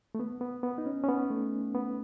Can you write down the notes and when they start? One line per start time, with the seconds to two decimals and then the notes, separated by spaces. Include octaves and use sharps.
0.15 A3
0.19 B3
0.41 B3
0.63 B3
0.78 D#4
0.86 C#4
1.03 C#4
1.09 B3
1.31 A3
1.75 B3